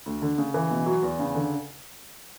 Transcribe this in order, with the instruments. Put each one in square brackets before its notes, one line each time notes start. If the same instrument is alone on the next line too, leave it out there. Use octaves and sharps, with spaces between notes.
[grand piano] D2
D3
C#3
E3
B2
F#3
E2
C#3
D3